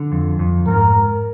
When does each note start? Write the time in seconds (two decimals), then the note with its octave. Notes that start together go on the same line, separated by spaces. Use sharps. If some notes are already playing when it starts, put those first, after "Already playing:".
Already playing: D3
0.12 F2
0.39 F2
0.67 G#2 A#4